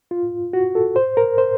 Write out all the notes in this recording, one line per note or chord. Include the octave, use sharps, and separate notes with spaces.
F4
F#4
A4
C5
A#4
C5